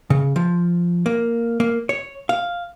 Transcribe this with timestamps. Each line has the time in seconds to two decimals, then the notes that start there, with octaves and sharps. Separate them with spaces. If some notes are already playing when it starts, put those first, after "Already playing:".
0.10 C#3
0.36 F3
1.06 A#3
1.60 A#3
1.89 C#5
2.29 F5